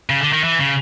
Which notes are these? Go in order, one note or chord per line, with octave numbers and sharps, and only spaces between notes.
C#3
D3
D#3
E3
C#3